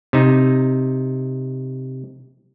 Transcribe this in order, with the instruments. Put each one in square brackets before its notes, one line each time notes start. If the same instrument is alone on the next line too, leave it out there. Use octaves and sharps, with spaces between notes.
[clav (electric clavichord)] C3 D#4